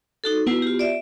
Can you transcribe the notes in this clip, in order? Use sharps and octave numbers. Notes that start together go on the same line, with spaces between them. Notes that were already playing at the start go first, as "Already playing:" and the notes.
D#4 F#4 A4
B3 E4 F#4 B4 C7
F4 G4
D5 E5